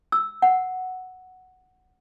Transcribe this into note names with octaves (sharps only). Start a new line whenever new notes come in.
E6
F#5